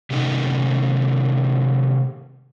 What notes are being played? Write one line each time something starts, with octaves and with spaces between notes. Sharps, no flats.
C3 D#3 A3 C#4 D#4 D#5